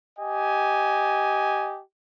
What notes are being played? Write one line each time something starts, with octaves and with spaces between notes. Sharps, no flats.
G4 D#5 G#5